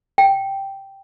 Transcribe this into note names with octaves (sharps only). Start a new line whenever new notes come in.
G5